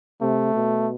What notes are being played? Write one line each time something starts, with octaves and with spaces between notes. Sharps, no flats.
C3 A3
B2